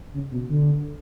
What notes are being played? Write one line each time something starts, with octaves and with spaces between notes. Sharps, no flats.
C#3
B2
D3